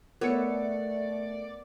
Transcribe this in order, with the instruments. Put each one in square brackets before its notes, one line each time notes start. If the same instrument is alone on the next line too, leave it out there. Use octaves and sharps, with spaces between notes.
[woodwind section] A3 [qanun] B3 A4 C#5 [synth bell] A#4 C#7 [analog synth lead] D5